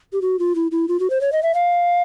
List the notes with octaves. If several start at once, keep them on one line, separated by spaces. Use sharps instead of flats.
G4
F#4
F4
E4
E4
F4
F#4
C5
C#5
D#5
E5
F5